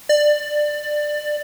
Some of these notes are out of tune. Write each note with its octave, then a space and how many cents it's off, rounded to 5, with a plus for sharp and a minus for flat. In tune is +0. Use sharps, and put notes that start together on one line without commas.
D5 +20